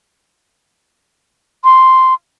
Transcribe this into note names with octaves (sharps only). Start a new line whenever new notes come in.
C6